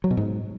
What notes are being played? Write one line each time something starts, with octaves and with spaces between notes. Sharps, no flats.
F#3
B2
G#2